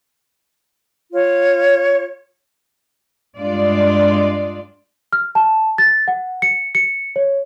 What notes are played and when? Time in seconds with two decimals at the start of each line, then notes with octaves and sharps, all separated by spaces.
1.12 F4 C#5
3.38 G2 G#3 D4 F4 D5
5.13 F6
5.35 A5
5.78 A6
6.08 F#5
6.42 C#7
6.75 C#7
7.16 C#5